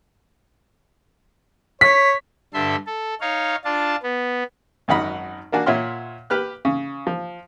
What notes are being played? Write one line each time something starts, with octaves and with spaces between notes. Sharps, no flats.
C#5 B6
G2 D3 A4 E5 C6
A4
D#4 C#5 F5
D4 F4 A5
B3
G#1 F#2 D#4 F#5 B5
A#3 D4 F#4 G#5
A#2 C#5 E5 F#5 C6 F6
G4 B4 F6 F#6
C#3
F3